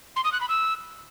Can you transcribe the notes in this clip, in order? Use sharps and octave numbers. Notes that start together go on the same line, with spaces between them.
C6
D#6
F#6
B5
E6